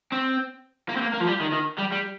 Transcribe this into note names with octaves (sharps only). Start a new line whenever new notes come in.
C4
A#3
C4
A#3
A#3
F3
G3
D#3
D#3
G3
G3